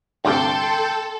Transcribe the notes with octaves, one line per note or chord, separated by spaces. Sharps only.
D2 G2 C3 A4 G5 C6